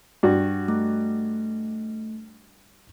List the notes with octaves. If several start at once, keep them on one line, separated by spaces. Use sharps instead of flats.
G2 F#4
A3